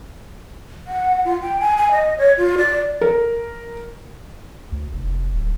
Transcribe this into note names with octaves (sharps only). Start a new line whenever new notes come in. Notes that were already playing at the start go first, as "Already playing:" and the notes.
F#5
F4
G5
G#5
G#5
D#5
C#5
F4
D5
A#4
D2
F1
D1